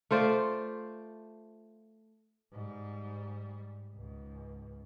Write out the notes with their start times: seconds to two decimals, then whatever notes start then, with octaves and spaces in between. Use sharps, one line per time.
0.11 A3 F4 C5 D5
2.53 G#2 G3
3.93 C#2 G#2